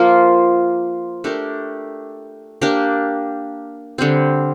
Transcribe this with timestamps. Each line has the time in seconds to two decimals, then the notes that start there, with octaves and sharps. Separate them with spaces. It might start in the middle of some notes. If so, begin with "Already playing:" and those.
Already playing: F3 A#3 F4 A#4
1.24 A3 D4 G4 A#4
2.62 A#3 D4 G4 A#4
3.98 D3 G3 C4